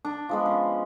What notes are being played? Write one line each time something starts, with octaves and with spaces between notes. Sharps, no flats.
D4
F3 G#3 B3
C#4